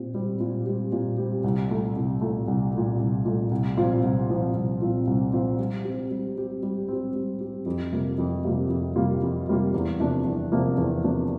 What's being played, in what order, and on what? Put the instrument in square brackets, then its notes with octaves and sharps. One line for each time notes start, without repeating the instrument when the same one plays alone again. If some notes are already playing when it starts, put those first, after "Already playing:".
Already playing: [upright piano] A#2 C4 G4
G3 C4 G4
A#2
G3 C4 G4
A#2
G3 C4 G4
C2
A#2 A3
C2
A#2 A3
C2
A#2 A3
C2
A#2 A3
C2
A#2 F3 C4 F4
C2
A#2 F3 C4 F4
C2
A#2 F3 C4 F4
C2
A#2 F3 C4 F4
G3
C4 G4
G3
C4 G4
G3
C4 G4
G3
C4 G4
F2
C3 G3 A#3 F4
F2
C3 G3 A#3 F4
F2
C3 G3 A#3 F4
F2
C3 G3 A#3 F4
E2
C3 F3 A#3 D4
E2
C3 F3 A#3 D4
E2
C3 F3 A#3 D4